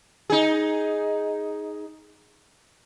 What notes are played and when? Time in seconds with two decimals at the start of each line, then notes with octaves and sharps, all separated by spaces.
0.30 D#4 G#4